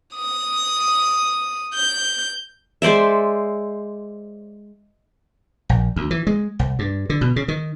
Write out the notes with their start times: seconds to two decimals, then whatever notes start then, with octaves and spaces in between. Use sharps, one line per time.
0.16 D#6
1.74 G6
2.82 G#3 C5 D5 E5
5.69 A#1
5.96 D2
6.11 E3
6.27 G#3
6.59 C2
6.79 G2
7.10 D3
7.21 B2
7.36 C#3
7.48 D#3